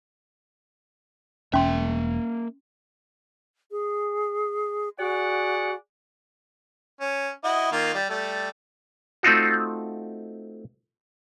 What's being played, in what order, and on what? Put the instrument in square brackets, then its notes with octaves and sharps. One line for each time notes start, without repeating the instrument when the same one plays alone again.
[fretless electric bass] E1 [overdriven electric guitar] A#3 E5 [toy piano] C#4 C6
[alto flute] G#4
[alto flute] F#4 [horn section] G#4 D5 F#5
[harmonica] C#4
E4 F#4 D#5
D#3 A#3 F4
G3
G3 A3
[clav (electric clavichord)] A3 C4 D#4 F4 F#4